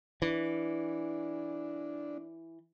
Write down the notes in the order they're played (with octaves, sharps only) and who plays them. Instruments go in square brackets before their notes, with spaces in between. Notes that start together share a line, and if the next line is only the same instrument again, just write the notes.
[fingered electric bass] E3 [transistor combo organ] D4